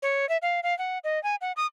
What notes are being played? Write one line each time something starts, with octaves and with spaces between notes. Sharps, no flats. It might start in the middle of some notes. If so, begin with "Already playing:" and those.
C#5
E5
F5
F5
F#5
D#5
G#5
F#5
D#6